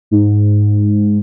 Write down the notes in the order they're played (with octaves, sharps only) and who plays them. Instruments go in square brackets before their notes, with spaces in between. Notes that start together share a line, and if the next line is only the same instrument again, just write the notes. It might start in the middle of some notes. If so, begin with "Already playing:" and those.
[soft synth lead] G#2